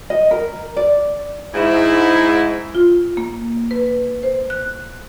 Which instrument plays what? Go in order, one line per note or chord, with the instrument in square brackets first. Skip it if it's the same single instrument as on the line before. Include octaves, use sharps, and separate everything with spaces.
[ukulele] D#5
A#4
D5
[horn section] G#2 E4
[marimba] F4
A#3
B4
C5
F#6